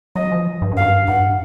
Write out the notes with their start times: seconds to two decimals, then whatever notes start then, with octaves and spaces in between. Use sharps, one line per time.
0.15 F#3 D#5
0.32 F3
0.62 G2
0.71 F#2
0.77 G2 F5
1.07 G2 F#5